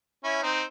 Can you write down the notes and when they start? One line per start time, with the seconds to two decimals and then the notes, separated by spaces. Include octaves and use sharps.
0.24 C#4 E4
0.42 C4 D#4